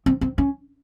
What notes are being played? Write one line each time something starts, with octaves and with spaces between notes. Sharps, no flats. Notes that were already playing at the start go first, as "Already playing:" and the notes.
C4
C4
C#4